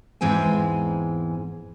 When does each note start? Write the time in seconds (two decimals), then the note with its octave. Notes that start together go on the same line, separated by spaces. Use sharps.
0.21 E2 G#2 E3 G#3 C4 G#5